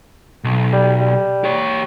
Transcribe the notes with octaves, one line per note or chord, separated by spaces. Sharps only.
B1
G3
G3
G4 C#5